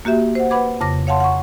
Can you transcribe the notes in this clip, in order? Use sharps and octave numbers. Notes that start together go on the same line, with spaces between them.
A#3 F#4 G4 E5
C5 F#5
B4 F#5 B5 D6 G#6
F2 C#3 D6 A#6
C#5 F5 F#5 A5 C6
F#5 C#6